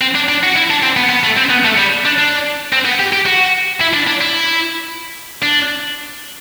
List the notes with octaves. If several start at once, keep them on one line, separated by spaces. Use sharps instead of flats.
C4
D4
D4
F#4
E4
D4
C4
B3
B3
A3
C4
B3
A3
G3
D4
D4
C4
B3
G4
G4
F#4
E4
D4
D4
E4
D4